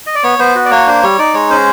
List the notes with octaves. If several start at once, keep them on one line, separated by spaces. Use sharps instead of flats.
D#5
D5
B3 C#5
B3 C5
F#4
D5
A#3 C#5
D4 C5
G3 C#5
D#4 D5
G#3 C#5
C#4 C5